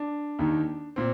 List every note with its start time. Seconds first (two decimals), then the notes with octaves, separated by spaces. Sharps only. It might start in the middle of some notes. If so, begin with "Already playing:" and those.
Already playing: D4
0.39 D#2 D#3
0.96 A#2 C4